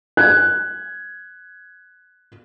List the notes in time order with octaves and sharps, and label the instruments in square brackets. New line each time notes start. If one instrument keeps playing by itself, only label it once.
[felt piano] F#6 G#6